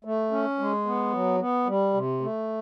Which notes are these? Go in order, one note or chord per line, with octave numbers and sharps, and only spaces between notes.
A3
C#4
G#3
B3
F#3
B3
G3
C3
A3